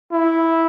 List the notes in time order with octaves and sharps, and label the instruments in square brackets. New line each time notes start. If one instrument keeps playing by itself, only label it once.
[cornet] E4